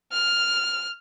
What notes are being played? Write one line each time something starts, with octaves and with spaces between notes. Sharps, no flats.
F6